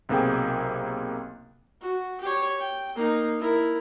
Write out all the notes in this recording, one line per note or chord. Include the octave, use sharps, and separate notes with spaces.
B1 C3 A#3 G#4 G5
F#4
G4 C#5
G5
A#3 D#4
E4 A#4